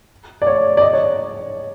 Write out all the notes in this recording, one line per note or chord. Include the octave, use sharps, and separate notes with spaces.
D5
C#5
D5
D#5
C#5